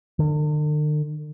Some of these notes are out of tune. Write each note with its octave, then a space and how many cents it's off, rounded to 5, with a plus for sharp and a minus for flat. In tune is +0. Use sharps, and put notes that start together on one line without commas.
D3 +45